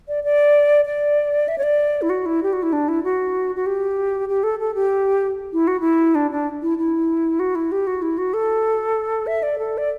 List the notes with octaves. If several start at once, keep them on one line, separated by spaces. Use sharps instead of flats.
D5
D5
D5
E5
C#5
D5
E4
F#4
E4
G4
F#4
E4
D4
E4
F#4
F#4
G4
G4
A4
A4
G4
E4
F#4
E4
D4
D4
E4
E4
F#4
E4
G4
F#4
E4
F#4
A4
E5
D5
A4
D5